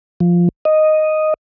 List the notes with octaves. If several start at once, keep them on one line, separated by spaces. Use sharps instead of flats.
F3
D#5